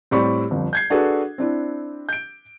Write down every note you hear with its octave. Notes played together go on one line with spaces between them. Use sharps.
A2 G3 C4 D5 B5 C#6
G1 F2
G6 G#6 C7
D4 F#4 G#4 A4 B4
C4 D4 E4
G6 D7